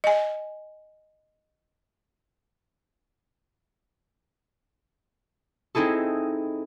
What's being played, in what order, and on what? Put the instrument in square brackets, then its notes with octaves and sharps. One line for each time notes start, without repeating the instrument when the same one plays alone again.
[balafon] D#5 G#5
[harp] C4 D#4 E4 G#4 A4